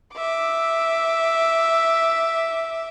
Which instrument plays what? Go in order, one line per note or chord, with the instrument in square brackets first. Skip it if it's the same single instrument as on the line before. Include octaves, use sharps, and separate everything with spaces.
[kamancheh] E5 D6